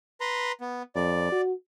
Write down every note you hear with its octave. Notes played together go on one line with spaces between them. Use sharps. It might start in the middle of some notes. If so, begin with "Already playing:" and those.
B4 A#5 C6
B3
F2 D5
F#4